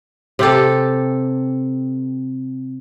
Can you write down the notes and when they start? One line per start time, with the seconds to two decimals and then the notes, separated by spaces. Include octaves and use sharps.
0.39 C3 G4 A4